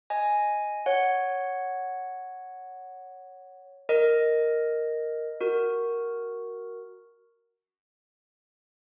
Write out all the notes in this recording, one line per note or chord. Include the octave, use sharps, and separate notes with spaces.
D#5 G#5
C#5 F#5
A#4 D#5
F#4 A#4